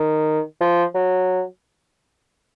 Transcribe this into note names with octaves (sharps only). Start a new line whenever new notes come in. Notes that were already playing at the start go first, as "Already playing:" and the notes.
Already playing: D#3
F3
F#3